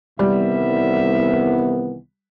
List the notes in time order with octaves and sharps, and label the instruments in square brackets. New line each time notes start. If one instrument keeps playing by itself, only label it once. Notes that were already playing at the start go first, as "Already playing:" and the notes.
[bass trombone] C2 [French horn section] D#3 E3 B3 [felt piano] G3 [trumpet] E5